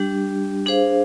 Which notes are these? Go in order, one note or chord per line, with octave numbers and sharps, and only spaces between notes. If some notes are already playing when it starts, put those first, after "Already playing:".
Already playing: G3 D4 G4
D4 G#4 C5 F5